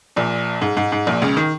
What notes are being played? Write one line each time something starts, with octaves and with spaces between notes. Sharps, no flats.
A#1 A#2
G#2
G#2
G#2
A#1 A#2
C#2 C#3
D#3